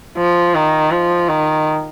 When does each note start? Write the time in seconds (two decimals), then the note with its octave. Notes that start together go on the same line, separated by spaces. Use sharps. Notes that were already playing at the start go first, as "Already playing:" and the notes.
0.18 F3
0.55 D#3
0.91 F3
1.28 D#3